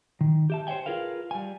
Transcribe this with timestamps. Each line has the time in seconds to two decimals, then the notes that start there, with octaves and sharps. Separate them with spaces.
0.21 D#3
0.50 G4 E5 A5
0.67 C5 C#5 E5 G5 G#5
0.86 F4 G#4 A#4 B4 F5
1.31 G3 G#5